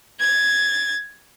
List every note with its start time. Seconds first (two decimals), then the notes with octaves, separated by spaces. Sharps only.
0.20 G#6 A6